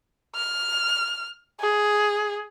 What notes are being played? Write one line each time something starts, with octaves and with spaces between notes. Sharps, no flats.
F6
G#4